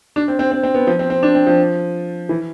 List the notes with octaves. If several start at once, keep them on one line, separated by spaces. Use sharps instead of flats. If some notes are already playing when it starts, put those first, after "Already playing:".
D4
C4
C4
C4
C4
B3
F3
C4
C4
D4
C4
F3
E3